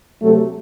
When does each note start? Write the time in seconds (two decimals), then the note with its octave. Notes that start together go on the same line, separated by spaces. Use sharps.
0.21 C3 F#3 A3